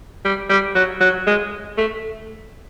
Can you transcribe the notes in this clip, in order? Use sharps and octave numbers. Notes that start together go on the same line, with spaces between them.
G3
G3
F#3
F#3
G#3
A3